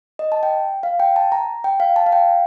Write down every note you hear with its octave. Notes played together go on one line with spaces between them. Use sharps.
D#5
A5
G5
F5
G5
A5
A#5
G5
F5
A5
F5
G5